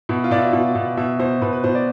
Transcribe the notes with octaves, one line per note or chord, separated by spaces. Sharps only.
B2 E4
F4
B2 D5
E5
B2
B2
B2 E5
B2 C5
B2 B4
B4
B2 C5
D5